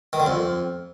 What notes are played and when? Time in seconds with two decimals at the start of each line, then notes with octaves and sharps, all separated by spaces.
0.13 D#3
0.20 D3
0.26 F2